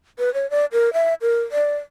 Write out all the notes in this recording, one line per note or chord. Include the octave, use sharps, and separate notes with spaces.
B4
C#5
D5
A#4
E5
A#4
D5